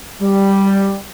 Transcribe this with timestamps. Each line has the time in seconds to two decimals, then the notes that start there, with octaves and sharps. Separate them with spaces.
0.21 G3